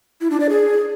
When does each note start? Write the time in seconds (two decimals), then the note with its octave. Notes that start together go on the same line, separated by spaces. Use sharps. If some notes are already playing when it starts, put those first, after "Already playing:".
0.21 E4
0.31 D4
0.40 D5
0.50 G#4